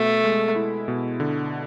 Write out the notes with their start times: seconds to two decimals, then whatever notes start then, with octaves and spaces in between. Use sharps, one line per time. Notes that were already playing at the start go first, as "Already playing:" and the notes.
Already playing: B2 A3
0.24 G#3
0.56 E4
0.88 B2
1.20 D3